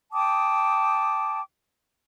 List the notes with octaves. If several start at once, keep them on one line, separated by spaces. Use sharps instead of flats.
G5 A5 D6 D#6